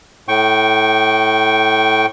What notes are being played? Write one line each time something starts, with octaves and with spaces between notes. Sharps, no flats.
A2 G5 C#6